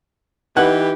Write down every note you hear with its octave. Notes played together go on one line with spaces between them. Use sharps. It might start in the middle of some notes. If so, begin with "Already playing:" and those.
E3 D#4 G4 B4 F#5